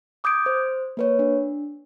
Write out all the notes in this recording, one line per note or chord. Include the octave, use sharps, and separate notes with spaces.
D6 D#6 G6 G#6 D7
C5
A#3 B4 C#5
D4